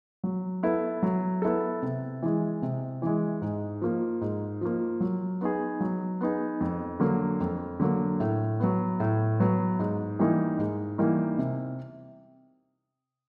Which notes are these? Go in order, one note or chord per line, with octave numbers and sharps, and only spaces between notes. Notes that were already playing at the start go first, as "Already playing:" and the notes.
F#3
B3 E4 A4
F#3
B3 E4 A4
C3
E3 G#3
C3
E3 G#3
G#2
F3 A#3
G#2
F3 A#3
F#3
B3 D#4 G#4
F#3
B3 D#4 G#4
F2
D3 F#3 A#3
F2
D3 F#3 A#3
A2
F#3 B3
A2
F#3 B3
G#2
E3 G3 A#3 D#4
G#2
E3 G3 A#3 D#4
C3